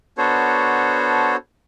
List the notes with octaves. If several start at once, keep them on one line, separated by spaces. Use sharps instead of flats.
B3 D4 F#4 A4 C5 C#5